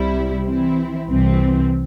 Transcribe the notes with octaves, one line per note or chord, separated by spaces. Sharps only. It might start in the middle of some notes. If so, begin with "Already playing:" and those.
Already playing: C2 C3 G3 E4
E3 C4 E4
C2 C3 E3 C4